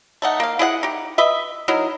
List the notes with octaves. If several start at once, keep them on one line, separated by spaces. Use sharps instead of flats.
A3 D#4 F#5
A#3 F5
E4 G#4 D#5 F#5
D#4 G4
B4 D#5 E5
F#3 D#4 E4 A#4